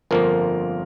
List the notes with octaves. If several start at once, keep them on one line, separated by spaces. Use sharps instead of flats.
G1 F2 F3 A#3 A#4